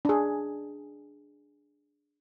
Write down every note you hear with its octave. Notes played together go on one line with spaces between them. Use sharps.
D4 G#4